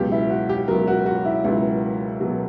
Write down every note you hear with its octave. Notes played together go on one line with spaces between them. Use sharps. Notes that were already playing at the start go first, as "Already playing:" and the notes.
Already playing: C#2 B2 F#3 G4
E4
F#4
G4
C#2 B2 F#3 A#4
F#4
F#4
E4
C#2 B2 F#3 E4
B2 F#3